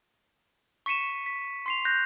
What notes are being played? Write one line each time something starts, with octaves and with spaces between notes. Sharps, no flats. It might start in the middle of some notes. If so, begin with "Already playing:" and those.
C#6 B6 C#7 D#7 E7
B6
C6 C7 F7
F#6 G6 A#6